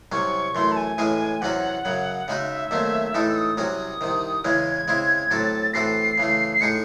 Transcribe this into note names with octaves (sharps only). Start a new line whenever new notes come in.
C2 C3 F#3 C#4 C#6
F#2 E3 A3 C6
A5
G#5
A2 E3 G#3 C#4 G#4
E2 C3 F#3 C#4 F#4 F#5
F#2 C#3 F#3
C#3 G#3 D#4 F#4 E5
D#2 D#3 F#3 A3 C4
A2 E3 G#3 D#4 A4
E6
D#6
C2 C3 F#3 C#4 F#4 D#6
C2 C3 D#3
E2 C#3 E3 G#3 C#4 G#6
C#3 G#3 C4 E4
A2 F#3 C4 F#4 A4 A6
A2 E3 C4 F#4 A4 C7
C#3 E3 A3
C7
A2 G#3 D#4 G#4 C#7